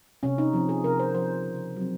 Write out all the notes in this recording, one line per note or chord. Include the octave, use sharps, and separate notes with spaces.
C3 C#4
D#4
F3 C4
G#4
C3 A#4
C5
F3 C4 C5
C#3
F#3 C4